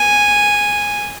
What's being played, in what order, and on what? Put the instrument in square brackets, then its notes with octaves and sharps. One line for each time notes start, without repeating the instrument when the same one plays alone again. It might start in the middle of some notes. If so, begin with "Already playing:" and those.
Already playing: [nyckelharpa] G#5